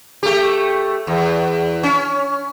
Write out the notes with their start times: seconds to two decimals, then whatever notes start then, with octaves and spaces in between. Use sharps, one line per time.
0.23 A3 G4
1.07 E2
1.83 C#4